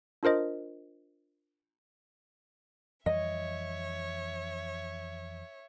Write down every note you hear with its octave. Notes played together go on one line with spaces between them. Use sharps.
D4 F4 A#4 C5 D#5
F2 E3 G3 C#5 D#5 E5